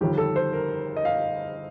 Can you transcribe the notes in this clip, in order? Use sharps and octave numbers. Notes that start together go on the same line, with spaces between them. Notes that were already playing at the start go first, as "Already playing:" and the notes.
G1 F2 D#3 G4
A4
C5
A#4
D#5
F5